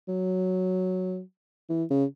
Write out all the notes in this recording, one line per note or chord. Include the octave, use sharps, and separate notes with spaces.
F#3
E3
C#3